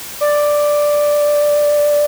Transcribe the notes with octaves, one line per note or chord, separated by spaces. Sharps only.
D5